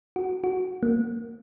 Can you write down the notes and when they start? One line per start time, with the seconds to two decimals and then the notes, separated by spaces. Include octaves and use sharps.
0.16 F#4
0.44 F#4
0.83 A#3